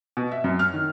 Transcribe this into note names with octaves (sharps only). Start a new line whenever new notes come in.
B2
E5
F#2
F6
D#3